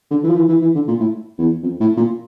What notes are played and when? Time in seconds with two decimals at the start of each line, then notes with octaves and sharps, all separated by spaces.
0.11 D3
0.23 E3
0.29 F3
0.36 E3
0.48 E3
0.61 E3
0.75 D3
0.87 A#2
1.00 A2
1.38 E2
1.63 F2
1.80 A2
1.97 A#2